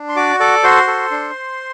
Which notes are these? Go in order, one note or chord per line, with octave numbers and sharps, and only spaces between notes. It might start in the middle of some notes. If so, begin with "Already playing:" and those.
Already playing: D4
C6
F#4 D5 D6
A4 D5 D6
F#4 C5 C6
A4
D4